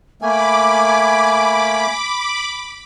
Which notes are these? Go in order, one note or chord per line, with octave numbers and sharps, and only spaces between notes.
A3 A#3 G#5 B5 D6